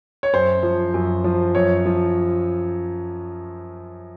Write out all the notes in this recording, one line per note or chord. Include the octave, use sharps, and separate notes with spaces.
C#5
F#2 C5
F3
F#2
F3
F#2 C#5
F3